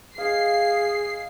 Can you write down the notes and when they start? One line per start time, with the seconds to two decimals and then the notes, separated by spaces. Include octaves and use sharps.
0.18 G#4 D#5 F5 C7